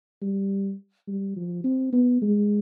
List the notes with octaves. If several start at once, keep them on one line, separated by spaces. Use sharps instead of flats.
G3
G3
F3
C4
B3
G#3